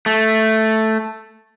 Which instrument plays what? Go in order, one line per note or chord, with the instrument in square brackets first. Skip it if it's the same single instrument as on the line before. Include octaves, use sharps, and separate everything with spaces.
[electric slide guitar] A3